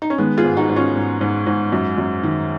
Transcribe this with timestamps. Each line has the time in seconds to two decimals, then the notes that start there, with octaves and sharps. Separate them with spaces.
0.02 D#4
0.10 C#4
0.18 D#3 G#3 B3
0.38 F4 G#4
0.44 G#2
0.57 D#4 F#4
0.69 G#2
0.76 C#4 F4
0.96 G#2
1.21 G#2
1.47 G#2
1.72 F#2
1.98 F#2
2.23 D#3